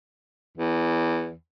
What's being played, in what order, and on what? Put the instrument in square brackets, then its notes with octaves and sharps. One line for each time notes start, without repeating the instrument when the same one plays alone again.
[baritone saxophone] E2